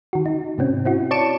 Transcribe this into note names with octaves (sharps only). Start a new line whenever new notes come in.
D#3 F#4
D#4
G#2 C3 C4 C#4
C4 E4 F#4
C#5 D5 A5 C#7 D7 E7